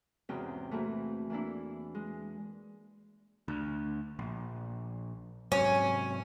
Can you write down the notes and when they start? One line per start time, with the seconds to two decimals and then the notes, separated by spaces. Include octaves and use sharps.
0.29 E2 G#2 C3 C#4 F#4 G5
0.71 E3 A3 A#3 C4 F#4
1.30 E3 A#3 D4 E4
1.95 G#3
3.48 D2
4.19 A#1
5.52 G#2 C3 F#3 C#4